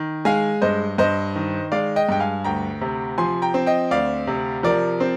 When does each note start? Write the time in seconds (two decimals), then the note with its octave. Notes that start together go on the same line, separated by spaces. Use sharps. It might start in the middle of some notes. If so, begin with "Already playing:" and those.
Already playing: D#3
0.25 G#3 F5 G#5
0.62 G2 C5 D#5
0.98 G2 C5 D#5
1.36 D#3
1.72 G#3 D5 F5
1.96 D#5 G5
2.09 G2 G5
2.20 F5 G#5
2.44 D2 G5 A#5
2.81 C3
3.18 F3 G#5 C6
3.42 G5 A#5
3.54 C4
3.66 D#5 G5
3.91 D2 D5 F5
4.27 C3
4.63 F3 A#4 D5
5.00 C4